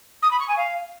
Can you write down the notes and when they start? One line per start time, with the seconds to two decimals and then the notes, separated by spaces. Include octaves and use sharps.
0.22 D#6
0.31 B5
0.40 C#6
0.48 G#5
0.57 F5